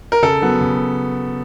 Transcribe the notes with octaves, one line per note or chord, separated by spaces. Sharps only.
A#4
C#3 A4
F#3 B3
C#3